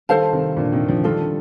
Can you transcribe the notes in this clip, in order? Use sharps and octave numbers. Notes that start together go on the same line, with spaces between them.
D#3 G3 A4 C5 F5 A5
C3 D#3
A#2 D3
C3 D#3
D3 F3
D#3 G3 D4 F4 A4